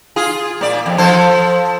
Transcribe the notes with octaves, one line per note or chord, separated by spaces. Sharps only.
F4 G#4
A#2 D5
F2
F3 A4 C5